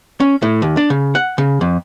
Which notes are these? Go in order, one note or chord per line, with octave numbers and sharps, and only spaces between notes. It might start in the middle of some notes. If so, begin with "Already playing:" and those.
C#4
A2
D#2
D4
C#3
F#5
C#3
F2